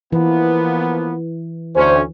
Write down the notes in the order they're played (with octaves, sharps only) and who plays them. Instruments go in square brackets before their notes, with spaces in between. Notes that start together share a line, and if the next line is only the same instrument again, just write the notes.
[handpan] E3 [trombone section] F3 A#3 B3
[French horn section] D2 C5 [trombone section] C#4